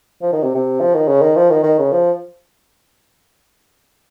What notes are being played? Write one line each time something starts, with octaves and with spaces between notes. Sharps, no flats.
F3
D#3
C3
C3
F3
D#3
C#3
D#3
F3
D#3
D#3
C#3
F3